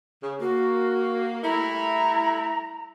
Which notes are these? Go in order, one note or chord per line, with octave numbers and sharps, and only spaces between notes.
C#3
A#3 F#4
G3 A3 E4 A#5